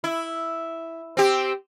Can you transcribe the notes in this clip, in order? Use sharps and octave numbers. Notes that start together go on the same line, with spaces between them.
E4
C4 G4